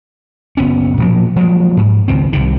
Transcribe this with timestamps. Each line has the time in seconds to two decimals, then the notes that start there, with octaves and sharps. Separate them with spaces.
0.57 F#1 B3 C#4
0.98 A#2 F3 F#3 A#3
1.36 F3 F#3 G#3 A#3
1.77 G#2
2.08 C#2 D#3 C4
2.33 C2 C3 D#3